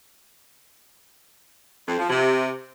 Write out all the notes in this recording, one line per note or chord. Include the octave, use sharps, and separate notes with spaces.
F2
F3
C3